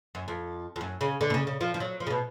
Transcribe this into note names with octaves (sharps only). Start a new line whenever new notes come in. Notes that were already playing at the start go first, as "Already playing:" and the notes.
F#2
F2
F2
F#2
C#3
D3
B2
C#3
C#3
F3
F3
F#3
F3
C#3
B2